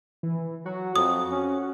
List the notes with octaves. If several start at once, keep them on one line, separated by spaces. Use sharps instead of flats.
E3
F#3 F#4
F2 D#6
C#4